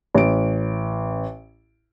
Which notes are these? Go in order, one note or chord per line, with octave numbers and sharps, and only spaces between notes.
A1 D7